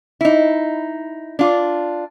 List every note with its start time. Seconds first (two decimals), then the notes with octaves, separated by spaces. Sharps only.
0.21 D#4 E4
1.39 D4 F4